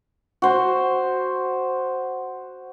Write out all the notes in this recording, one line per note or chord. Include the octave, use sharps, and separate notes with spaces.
F#4 C5